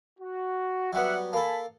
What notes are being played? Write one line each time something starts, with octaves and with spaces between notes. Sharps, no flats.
F#4
F#3 G3 B3 D5 E5 F#5
A#3 A4 G#5 A5 B5